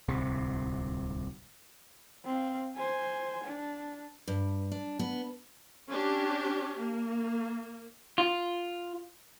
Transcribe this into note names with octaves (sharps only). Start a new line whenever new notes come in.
D1 C2 C3
C4 F5
C5 G#5
D4
G2
D4
B3
C#4 D4 G4
A#3
F4